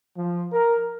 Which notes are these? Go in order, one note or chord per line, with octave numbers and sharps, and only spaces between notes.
F3
A#4